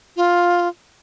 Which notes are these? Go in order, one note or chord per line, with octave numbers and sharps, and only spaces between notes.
F4